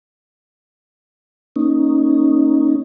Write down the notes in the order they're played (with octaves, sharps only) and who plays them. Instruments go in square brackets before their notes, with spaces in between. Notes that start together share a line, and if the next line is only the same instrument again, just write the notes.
[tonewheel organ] A#3 C#4 D#4